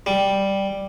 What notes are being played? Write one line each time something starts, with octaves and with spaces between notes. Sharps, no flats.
G3